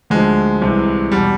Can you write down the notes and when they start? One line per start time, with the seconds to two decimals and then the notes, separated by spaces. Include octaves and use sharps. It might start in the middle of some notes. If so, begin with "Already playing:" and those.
0.10 D2 D3 F3 G#3
0.62 C2 C3 E3
1.12 E2 B2 G3